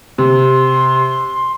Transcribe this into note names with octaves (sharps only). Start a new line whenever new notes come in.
C3 C6